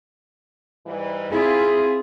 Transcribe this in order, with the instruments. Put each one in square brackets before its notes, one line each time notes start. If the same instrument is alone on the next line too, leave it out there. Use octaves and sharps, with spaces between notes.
[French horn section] G#2 E3 G3
[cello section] C4 E4 F4 [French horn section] G#4